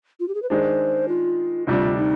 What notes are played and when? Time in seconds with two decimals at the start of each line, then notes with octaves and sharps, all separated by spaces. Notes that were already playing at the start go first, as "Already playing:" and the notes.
0.20 F4
0.28 G4
0.34 G#4
0.42 B4
0.50 D#3 G#3 D4 C5
1.08 F4
1.67 D2 C3 G3 D4 F4
1.97 D#4